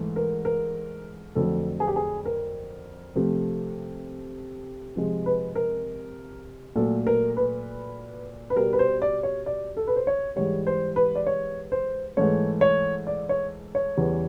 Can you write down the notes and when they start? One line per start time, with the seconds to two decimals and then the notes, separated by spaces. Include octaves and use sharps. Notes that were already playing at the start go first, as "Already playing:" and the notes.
Already playing: G#2 E3 A3
0.16 A#4
0.45 A#4
1.35 F2 D3 F#3 A3 A4
1.80 G#4
1.87 G4
1.96 G#4
2.26 A#4
3.15 C3 F3 A3
4.96 C3 F3 G#3
5.26 B4
5.55 A#4
6.76 A#2 F#3 A3 A4
7.07 A#4
7.37 B4
8.50 B4
8.56 B2 G3 A#4
8.73 B4
8.79 C5
9.02 D5
9.23 C#5
9.46 D5
9.77 A4
9.88 B4
9.96 C5
10.07 C#5
10.36 G#2 E3 G3 C#5
10.67 C5
10.96 B4
11.15 D5
11.27 C#5
11.72 C5
12.17 G#2 E3 A3 C#5
12.61 C#5
13.07 D5
13.29 C#5
13.75 C#5
13.97 E2 C#3 E3 G3